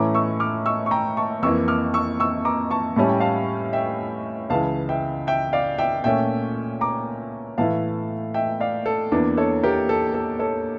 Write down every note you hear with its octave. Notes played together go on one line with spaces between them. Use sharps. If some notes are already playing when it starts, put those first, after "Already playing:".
Already playing: A2 E3 A3 C#4 A#5 D6
C#6 E6
D6 F6
C#6 E6
C#6
G5 A#5
A5 C#6
F2 E3 A#3 C#6 E6
D6 F6
C#6 E6
C#6 E6
A#5 D6
A5 C#6
A2 G3 C#4 A5
G5
F5 A5
E5 G5
C#2 C#3 E3 F5 A5
E5 G5
E5 G5
D5 F5
E5 G5
A#2 A3 C#4 E5 G5
A#5 D6
A2 E3 A3 F5 A5
E5 G5
D5 F5
A4
E2 E3 A#3 D4
A4 C#5
G4 A#4
A4
A4
A4 C#5